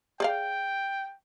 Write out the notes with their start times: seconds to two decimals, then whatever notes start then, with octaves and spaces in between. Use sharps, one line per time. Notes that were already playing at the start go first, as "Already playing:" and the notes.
0.20 G#4 D5 F5 G5